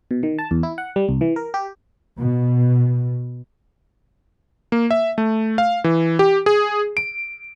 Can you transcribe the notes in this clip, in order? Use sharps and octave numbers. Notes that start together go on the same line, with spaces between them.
B2
D#3
A5
E2
E4
F#5
G3
C2
E3
A#4
G4
B2
A#3
E5
A3
F5
E3
G4
G#4
D7